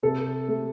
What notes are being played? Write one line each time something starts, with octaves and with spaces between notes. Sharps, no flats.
C3 A4
A3